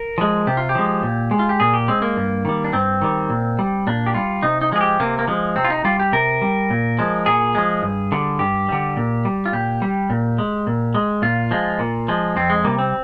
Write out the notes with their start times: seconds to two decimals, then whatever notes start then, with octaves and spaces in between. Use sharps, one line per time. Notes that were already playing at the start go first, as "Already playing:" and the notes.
Already playing: A#4
0.18 F3 G#3
0.47 C3 G4
0.57 F4
0.69 G4
0.75 F3 G#3
1.03 A#2
1.31 G#3
1.39 F4
1.49 G4
1.60 A#2 G#4
1.74 G4
1.88 G#3 C4
2.02 A#3
2.17 G2
2.45 D#3 G3
2.64 D4
2.73 G2 C4
3.01 D#3 G3
3.30 A#2
3.59 G3
3.87 A#2 D4
4.06 G4
4.14 G3 F4
4.43 C3 D#4
4.61 D#4
4.72 F3 G#3 G#4
4.81 G4
5.00 C3 A#3
5.19 A#3
5.28 F3 G#3
5.56 C3 C4
5.65 F4
5.70 D#4
5.84 G3 F4
6.00 G4
6.12 C3 A#4
6.42 G3
6.70 A#2
6.99 F3 G#3
7.26 A#2 G#4
7.55 F3 G#3
7.82 G2
8.12 D3 G3
8.39 G2 G4
8.69 D3 G3
8.97 A#2
9.25 G3
9.46 F4
9.53 A#2 G4
9.82 G3
10.10 A#2
10.38 G#3
10.67 A#2
10.95 G#3
11.22 A#2 F4
11.51 F3 G#3
11.79 A#2
12.08 F3 G#3
12.36 F2 C4
12.50 G#3
12.65 C3 G3 A#3
12.79 C4